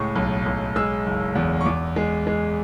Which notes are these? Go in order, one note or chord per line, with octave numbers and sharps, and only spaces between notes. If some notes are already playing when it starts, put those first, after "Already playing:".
Already playing: C#2 A2 G#3 C#6
B1
B1
G#3 E6
F#1
E2
C#6
E2 D6
G#3
G#3